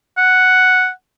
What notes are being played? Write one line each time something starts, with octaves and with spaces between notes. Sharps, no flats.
F#5